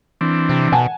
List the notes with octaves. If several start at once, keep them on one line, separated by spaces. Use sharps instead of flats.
E3 C4 D4
C3
B2 F#5 G#5 A5